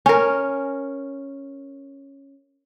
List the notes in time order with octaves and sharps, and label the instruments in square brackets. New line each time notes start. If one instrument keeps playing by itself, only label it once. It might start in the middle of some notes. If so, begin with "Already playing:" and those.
[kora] C#4 A#4